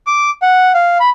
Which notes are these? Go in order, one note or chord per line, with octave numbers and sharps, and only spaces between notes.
D6
F#5
F5
B5